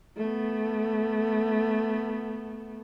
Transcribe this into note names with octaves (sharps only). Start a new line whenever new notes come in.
A3 B3